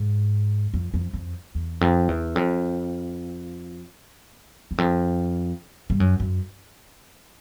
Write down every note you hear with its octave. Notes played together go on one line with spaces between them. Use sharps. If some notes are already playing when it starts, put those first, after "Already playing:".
Already playing: G#2
F2
F2
F2
E2
F2
E2
F2
E2
F2
G2
F#2
F#2